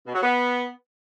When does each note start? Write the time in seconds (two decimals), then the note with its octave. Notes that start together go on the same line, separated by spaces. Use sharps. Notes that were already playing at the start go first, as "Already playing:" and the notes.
0.05 B2
0.14 F#3
0.23 B3